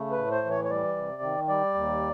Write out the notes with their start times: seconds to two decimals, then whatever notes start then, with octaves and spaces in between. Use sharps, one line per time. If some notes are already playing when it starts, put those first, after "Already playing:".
Already playing: C#3 A3
0.11 B4
0.18 A2
0.31 C5
0.44 E3
0.50 C#5
0.65 C#5
0.70 G3 D5
0.96 C3
1.23 D#3
1.48 G3 D5
1.74 D#2